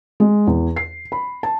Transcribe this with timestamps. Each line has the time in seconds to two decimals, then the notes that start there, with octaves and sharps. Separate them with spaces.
0.20 G#3
0.47 E2
0.76 C7
1.12 B5
1.43 A5